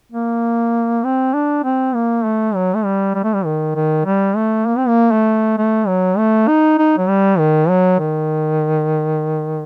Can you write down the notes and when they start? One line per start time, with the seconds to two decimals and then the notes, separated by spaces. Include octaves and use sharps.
0.12 A#3
1.04 C4
1.34 D4
1.64 C4
1.95 A#3
2.24 A3
2.55 F#3
2.75 A3
2.85 G3
3.15 G3
3.24 A3
3.34 G3
3.45 D#3
3.75 D#3
4.05 G3
4.36 A3
4.67 A#3
4.78 C4
4.88 A#3
5.12 A3
5.58 A3
5.87 F#3
6.18 A3
6.48 D#4
6.78 D#4
6.97 F#3
7.09 G3
7.39 D#3
7.69 F#3
8.00 D#3